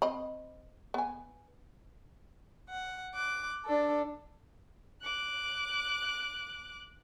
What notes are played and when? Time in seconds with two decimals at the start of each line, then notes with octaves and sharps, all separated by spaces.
0.02 C4 D#5 B5
0.94 B3 G#5
2.69 F#5
3.14 D6 F#6
3.65 D4 A4
5.03 D6 F#6